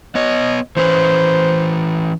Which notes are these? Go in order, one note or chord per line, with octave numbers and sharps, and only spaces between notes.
B3 C#5 D#5
E3 C#4 B4 C5